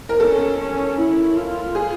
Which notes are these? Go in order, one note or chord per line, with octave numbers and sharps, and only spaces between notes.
A#4
C#4 A4
C#4
E4
F4
G#4